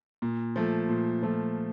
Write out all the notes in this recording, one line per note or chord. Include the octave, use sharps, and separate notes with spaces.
A#2
F3 A3
A#2
F3 A3